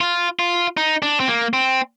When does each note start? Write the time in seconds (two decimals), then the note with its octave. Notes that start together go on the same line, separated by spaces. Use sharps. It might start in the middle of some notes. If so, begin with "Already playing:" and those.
0.01 F4
0.39 F4
0.77 D#4
1.02 D4
1.20 C4
1.28 A#3
1.53 C4